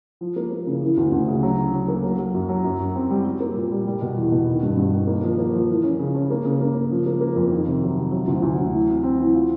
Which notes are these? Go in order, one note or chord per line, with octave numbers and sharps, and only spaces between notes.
F3
A#3
A#3
C#3
E3
D2
D2
C#3
F#3
D3
F#3
A#3
F#3
F#3
F#2
F#3
F#2
F#2
C4
G3
G3
A#3
A#2
G3
G3
B2
E2
B2
D#3
G2
G2
D#3
A#3
F3
A#3
F3
E3
C#4
C#3
C#4
A#3
C#3
A#3
C#3
F3
A#3
A#3
F2
D#3
C3
F#3
C3
F#3
D2
D2
F#3
E3
C4
C4
E3
F4